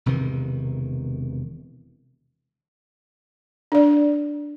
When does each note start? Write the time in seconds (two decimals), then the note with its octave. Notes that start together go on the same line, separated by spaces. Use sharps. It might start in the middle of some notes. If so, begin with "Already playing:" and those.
0.06 E1 C3 D#3 E3
3.72 D4 D5